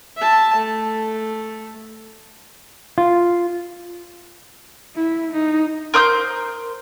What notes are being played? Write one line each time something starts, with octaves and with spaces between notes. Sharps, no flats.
E5 A5
A3
F4
E4
D#4
A#4 C5 D#6 G6